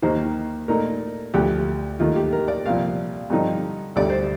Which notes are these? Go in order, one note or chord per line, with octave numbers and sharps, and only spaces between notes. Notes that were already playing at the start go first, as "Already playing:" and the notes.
D#2 D#3 A#3 D#4 C5
A#2 A3 D#4 A#4
D2 D3 F3 A3 G4
D#2 D#3 A3 F4
G4
A#4
D5
C2 A#2 F3 F5
G2 D3 F3 C4 D#4
D2 D3 G3 D5
C5